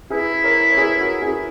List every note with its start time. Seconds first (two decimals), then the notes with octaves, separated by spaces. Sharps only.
0.10 E4 G#4 B4
0.44 A#4 C#5
0.71 C#5
0.77 G#4 B4
0.99 F#4 A#4
1.22 E4 G#4